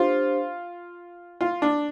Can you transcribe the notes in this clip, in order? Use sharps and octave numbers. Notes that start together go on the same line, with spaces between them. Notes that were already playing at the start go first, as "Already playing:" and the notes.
Already playing: D4 F4 G4 C5
F4
D4